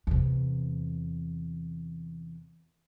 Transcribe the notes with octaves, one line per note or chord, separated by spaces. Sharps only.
E2 C3